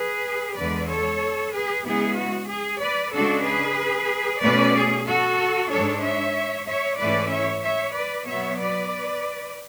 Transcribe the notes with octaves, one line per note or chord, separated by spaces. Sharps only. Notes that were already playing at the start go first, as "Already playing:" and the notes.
Already playing: G#4 B4
E2 D3 G#3 B4 D5
A4 C#5
G#4 B4
C#3 G#3 B3 E4 G#4
F#4
G#4
B4 D5
C#3 G#3 D4 F#4 A4
G#4 B4
B2 A3 C#4 B4 D5
G#4
F#4 A4
G#2 G#3 D4 A4 C#5
C#5 E5
C#5 E5
G#2 E3 A3 C#4 E4 B4 D5
C#5 E5
C#5 E5
B4 D5
B2 F#3 B3 C#5 E5
B4 D5